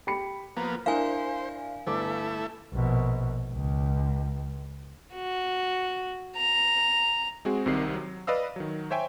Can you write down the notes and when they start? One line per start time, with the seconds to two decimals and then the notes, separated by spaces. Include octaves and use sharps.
0.07 G4 B5 C#7
0.57 F3 A#3 B3 A#5
0.86 D4 E4 A#4 C5 F5 G#5
1.87 G1 A3 E4 D6
2.73 A#1 B2
3.52 C#2
5.14 F#4
6.37 A#5
7.45 G#3 C4 F#4 G#4
7.66 C2 C3 D#3 C7
7.94 F#3
8.27 B4 D5 D#5 F5 E6
8.56 D#3 F#3
8.90 C5 C#5 E5 G5 G#5